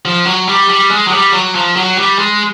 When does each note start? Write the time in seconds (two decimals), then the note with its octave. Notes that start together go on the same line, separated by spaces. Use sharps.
0.05 F3
0.27 F#3
0.48 G3
0.69 G3
0.91 G#3
1.07 F#3
1.12 G3
1.33 F#3
1.55 F3
1.76 F#3
1.98 G3
2.19 G#3